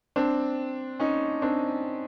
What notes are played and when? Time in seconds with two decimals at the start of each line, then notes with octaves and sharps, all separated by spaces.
0.16 C4 D4
0.99 C#4 D#4
1.42 C4 D4